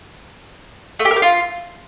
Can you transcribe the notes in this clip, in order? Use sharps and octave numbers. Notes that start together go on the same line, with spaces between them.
A3
G4
A#4
G4
F4